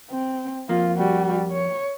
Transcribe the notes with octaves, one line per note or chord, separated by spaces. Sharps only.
C4
F2 A#3 F4
G3 F#4
C#5